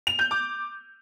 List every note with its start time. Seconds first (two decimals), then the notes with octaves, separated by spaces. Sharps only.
0.07 F7
0.19 G6
0.31 D6